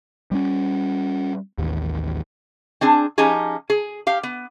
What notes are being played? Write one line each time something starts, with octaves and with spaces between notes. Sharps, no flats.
G3 C4 C#4
A1 D#2
C4 D4 G#4
F3 C#4 D#4 G4 G#4
G#4
G4 F5
B3